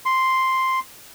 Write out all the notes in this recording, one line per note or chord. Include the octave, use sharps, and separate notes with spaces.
C6